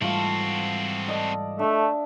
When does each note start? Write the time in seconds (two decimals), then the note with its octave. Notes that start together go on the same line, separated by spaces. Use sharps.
0.01 G#2 E3 G3 A3 C4 F4 F#4 C#6
1.08 A4 D5 D#5
1.59 A3 D4 E5